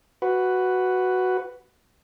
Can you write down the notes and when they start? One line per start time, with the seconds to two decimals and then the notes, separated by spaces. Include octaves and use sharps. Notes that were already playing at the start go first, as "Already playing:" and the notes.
0.22 F#4 B4